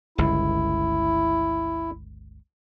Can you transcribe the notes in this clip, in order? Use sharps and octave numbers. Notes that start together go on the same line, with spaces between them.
G1 C#2 E4